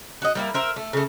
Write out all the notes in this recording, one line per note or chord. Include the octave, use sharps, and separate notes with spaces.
F#4 D#5
G3 A#3 E4
A#4 C5 E5
A3
C#3 A3